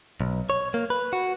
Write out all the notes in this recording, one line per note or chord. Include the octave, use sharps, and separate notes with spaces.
B1
C#5
A#3
B4
F#4